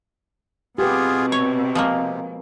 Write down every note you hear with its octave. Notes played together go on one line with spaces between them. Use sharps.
B2 B3 C4 F4 G4 G#4 B4
C3 C#5
F3 G#3 A#3